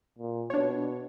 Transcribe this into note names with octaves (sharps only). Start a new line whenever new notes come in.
A#2
B2 D4 C#5